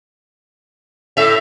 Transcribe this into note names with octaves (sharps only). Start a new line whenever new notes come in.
A2 A4 E5 F7